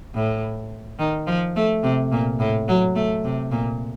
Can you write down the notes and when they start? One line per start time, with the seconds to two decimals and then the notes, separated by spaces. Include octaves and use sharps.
0.15 A2
0.99 D#3
1.27 F3
1.56 A3
1.83 C3
2.12 A#2
2.40 A2
2.68 F#3
2.96 A3
3.24 C3
3.51 A#2